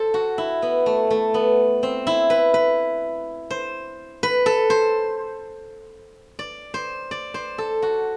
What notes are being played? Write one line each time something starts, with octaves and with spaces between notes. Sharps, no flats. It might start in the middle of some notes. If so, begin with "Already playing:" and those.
Already playing: A4 C5
F#4
E4
B3
A3
A3
B3
C4
E4
B4
B4
C5
B4
A4
C5
D5
C5
D5
C5
A4
F#4